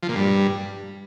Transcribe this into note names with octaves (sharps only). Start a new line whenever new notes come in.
F3
A#2
G2